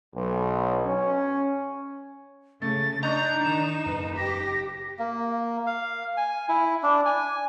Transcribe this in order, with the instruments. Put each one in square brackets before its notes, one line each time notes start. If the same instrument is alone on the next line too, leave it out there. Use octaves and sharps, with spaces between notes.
[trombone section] B1
C#4
[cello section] C#3 [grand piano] A3 [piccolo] A6
[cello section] D4 D#4 [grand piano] D#5 C#6 F#6 [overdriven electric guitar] A#5 [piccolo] G6
[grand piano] D#3 [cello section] D#4 [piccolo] E7
[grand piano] F#1 B4
[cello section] G4 [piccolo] A#6
[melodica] A#3
F5
G#5
E4
D4
G#5